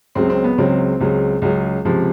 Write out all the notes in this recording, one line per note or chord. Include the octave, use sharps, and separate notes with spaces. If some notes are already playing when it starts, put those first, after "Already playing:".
C#2 C#3 F#3 C4
C4
B3
C#2 C#3 F#3 C4
C#2 C#3 F#3
C#2 C#3 F#3
C#2 C3 F3